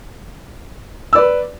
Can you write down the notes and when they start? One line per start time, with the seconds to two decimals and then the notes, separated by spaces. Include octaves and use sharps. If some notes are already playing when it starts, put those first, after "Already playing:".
1.13 E6
1.15 D5
1.18 B4